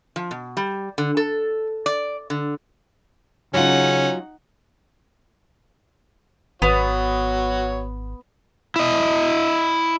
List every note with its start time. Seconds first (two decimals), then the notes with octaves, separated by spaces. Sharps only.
0.16 F3
0.31 B2
0.57 G3
0.98 D3
1.17 A4
1.86 D5
2.30 D3
3.54 C#3 F#3 C#4 D#4 F4 F#5
6.62 G#1 B3 F#4 C#5
8.76 E4 D#5